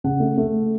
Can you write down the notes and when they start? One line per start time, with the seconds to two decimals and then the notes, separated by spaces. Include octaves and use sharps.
0.04 C#3 F#5
0.20 A3
0.38 A3